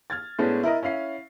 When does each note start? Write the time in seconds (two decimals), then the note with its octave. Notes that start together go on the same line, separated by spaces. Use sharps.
0.10 F6 G#6 A6
0.39 A2 G#3 B3 C#4 D4
0.63 E4 A#4 D#5
0.83 C#4 E4 F5 C7